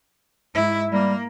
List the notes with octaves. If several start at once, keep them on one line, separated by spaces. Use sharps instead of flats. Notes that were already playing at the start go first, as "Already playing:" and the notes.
G#2 E4
G3 A#3